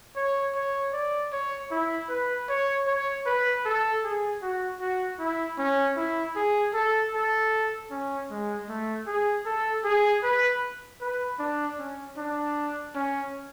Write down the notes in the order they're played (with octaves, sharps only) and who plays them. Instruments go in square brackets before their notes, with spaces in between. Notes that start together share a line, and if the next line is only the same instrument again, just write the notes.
[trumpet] C#5
C#5
D5
C#5
E4
B4
C#5
C#5
B4
A4
G#4
F#4
F#4
E4
C#4
E4
G#4
A4
A4
C#4
G#3
A3
G#4
A4
G#4
B4
B4
D4
C#4
D4
C#4